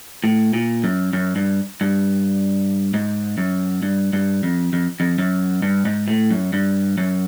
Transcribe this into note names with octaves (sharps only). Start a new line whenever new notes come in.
A2
A#2
F#2
F#2
G2
G2
G#2
F#2
G2
G2
F2
F2
F2
F#2
G2
G#2
A2
F#2
G2
F#2